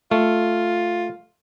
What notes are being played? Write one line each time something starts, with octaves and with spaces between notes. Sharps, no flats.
A3 F4